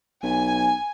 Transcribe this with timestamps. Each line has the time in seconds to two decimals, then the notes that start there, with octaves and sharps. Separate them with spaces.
0.23 B1 G#5